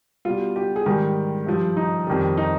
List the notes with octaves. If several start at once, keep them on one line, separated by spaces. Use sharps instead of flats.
B2 G3 F4
G4
G#4
G#2 D#3 G3 G4
G2 F3
D#4
F2 D#3 G3
D#4